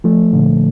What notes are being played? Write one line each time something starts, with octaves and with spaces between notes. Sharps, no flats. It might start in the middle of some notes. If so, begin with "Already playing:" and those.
F3 A3
A#2 D3